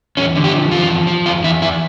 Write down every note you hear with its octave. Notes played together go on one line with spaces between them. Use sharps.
E2 C#4
D3
G4
F3
E2 F4
F3
F3
E2 F4
E2 E4
E2 E4